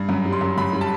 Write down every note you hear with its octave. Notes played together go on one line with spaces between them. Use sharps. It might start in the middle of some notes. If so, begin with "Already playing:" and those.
Already playing: G2
F#2
G3
C6
F#2
F#2 B5
G3
A5